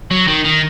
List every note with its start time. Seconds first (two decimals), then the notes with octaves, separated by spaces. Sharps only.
0.11 F#3
0.28 D#3
0.45 D#3